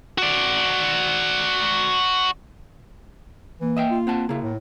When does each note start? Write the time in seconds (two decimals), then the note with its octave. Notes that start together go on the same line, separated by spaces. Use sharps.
0.18 F#4 D5
3.61 E3 A#3
3.77 D#5 E5 G5
3.91 F4
4.07 C4 F#5 A5
4.29 C#3 A#3 E4
4.42 A2